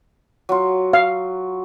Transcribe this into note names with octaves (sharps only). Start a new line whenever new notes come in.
F#3 F4
F5